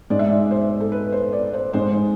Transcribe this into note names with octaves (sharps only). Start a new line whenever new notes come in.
G#2 G#3 D5
E5
D5
C5
A4
B4
C5
D5
C5
G#2 G#3 C5